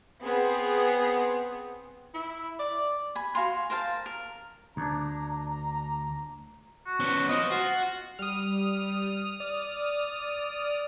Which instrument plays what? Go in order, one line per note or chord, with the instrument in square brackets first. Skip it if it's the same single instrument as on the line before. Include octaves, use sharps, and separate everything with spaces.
[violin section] B3 C4 G#4
[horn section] E4
D5
[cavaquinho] G#5 B5
F#4 F5 G#5 C6
A#4 C5 F5 A5
A#4
[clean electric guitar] D2 D4 [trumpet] A#5
[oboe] F#4
[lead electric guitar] B3 C#4
[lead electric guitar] F4 C5 [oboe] D#5
[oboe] F4 [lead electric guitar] F#4
[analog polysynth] G3 [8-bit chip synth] D#6 F6
[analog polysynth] D5